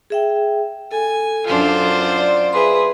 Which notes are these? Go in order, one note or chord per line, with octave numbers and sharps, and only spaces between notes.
G#4 E5 G5
A4 G#5
F#2 D4 F4 C5
D5
G#4 B4 E5 C6